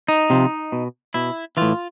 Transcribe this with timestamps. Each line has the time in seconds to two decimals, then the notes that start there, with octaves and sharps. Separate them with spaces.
0.08 D#4
0.30 C3 F3
0.72 B2
1.14 B2 E4
1.57 A2 E3 F4